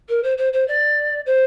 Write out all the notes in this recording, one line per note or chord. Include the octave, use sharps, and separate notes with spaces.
A#4
C5
C5
C5
D5
C5